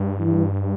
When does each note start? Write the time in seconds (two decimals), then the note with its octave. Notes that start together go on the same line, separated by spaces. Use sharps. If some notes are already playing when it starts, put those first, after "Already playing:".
Already playing: G2
0.20 E3